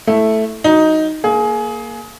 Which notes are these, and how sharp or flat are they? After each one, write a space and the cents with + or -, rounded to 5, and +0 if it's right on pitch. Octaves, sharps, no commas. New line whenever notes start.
A3 +0 E4 +0
F#3 +0 D#4 +10
A#3 +0 G#4 +25